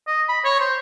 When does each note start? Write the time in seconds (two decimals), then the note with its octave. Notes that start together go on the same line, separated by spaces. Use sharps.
0.08 D#5
0.29 B5
0.45 C#5
0.60 C5